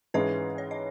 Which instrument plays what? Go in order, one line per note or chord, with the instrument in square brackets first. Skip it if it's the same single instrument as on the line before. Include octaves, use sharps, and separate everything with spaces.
[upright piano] G#2 E3 G#3 C#4 G#4 [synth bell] B4 D#5
[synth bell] C#5
D#5